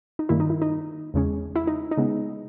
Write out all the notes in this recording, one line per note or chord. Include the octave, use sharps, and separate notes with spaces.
D#4
G2 D#3 A#3 E4
D#4
E4
D#4
E2 C#3 G#3 C#4
E4
D#4
D#4
C#3 G#3 B3